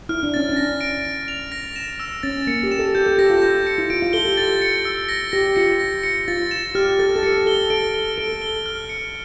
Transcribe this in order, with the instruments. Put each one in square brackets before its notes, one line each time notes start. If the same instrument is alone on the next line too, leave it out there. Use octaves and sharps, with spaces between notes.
[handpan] E4 [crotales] F6
[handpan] D4
[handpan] C#4 [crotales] A6
[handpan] D4
[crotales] A#6
D7
D7
F7
A#6
E7
E6
[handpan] C#4 [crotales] A6
[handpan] A#3 [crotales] C#7
[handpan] G4
[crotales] E7
[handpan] A4
[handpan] G4 [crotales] G6
[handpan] A4
[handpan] G4 [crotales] A#6
[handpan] F4
[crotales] G6
C#7
[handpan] E4
[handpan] F4 [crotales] D7
[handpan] F4
[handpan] A4 [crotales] G7
[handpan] G4
[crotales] A6
C#7
E6
A#6
[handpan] G4 [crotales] A#6
[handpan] F4 [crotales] C#7
[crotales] A#6
C#7
[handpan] F4 [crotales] A6
[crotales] E7
[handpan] G4 [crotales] F6
[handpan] A4 [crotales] A6
[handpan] A4
[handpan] G4 [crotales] C#7
[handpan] A4 [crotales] G7
[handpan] A4 [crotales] D7
[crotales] G7
[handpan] A4 [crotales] D7
[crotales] G7
F6
C#7